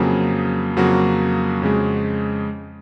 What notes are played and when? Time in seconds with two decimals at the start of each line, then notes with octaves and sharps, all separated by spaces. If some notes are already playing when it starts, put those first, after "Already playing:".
Already playing: F2 C#3 F#3 A#3 G#4
0.77 F2 C#3 F#3 A#3 F#4
1.62 F2 C#3 G#3